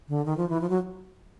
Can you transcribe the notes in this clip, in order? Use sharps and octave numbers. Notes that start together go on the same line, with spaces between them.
D3
D#3
F3
E3
F3
F#3